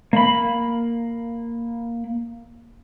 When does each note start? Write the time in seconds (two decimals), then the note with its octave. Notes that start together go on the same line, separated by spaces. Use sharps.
0.13 A#3 B5